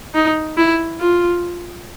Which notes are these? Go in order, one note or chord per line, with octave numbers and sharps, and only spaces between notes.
D#4
E4
F4